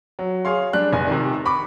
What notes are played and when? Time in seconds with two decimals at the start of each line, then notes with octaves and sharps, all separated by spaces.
0.19 F#3
0.45 G#4 C#5 F5 C6
0.73 G3 D4 F#6
0.92 F1 G#5
1.08 C3 D#3
1.46 B5 C#6 D6